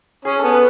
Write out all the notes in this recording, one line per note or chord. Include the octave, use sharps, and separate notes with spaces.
C#4 G#4
A4
B3
B4